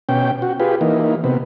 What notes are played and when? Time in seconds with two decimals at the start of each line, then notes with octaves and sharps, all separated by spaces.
0.09 B2 C#4 G5
0.42 F#4
0.60 F4 G4 G#4 B4
0.81 E3 A#3 D#4
1.24 C3 B3